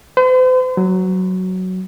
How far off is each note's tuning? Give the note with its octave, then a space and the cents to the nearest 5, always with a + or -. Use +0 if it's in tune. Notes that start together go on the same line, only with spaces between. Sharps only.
C5 -45
F#3 +5